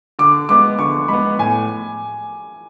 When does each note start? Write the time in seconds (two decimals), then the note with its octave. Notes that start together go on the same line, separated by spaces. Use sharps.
0.19 D3 D6
0.49 G#3 B3 D6
0.79 D3 C#6
1.08 G#3 B3 B5
1.39 A2 G#5